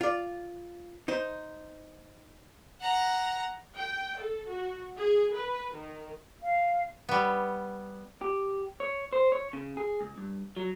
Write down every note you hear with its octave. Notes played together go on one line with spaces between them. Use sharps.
F4 D5
D#4 C5
F#5 A#5
G5
A4
F#4
G#4
B4
D#3
F5
G3 B3
G4
C#5
C5
C#5
C#3
G#4
C#2
G2
F#3